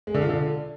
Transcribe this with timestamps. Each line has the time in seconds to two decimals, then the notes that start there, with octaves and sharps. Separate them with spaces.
0.07 G#3
0.14 D3
0.22 F4
0.29 D3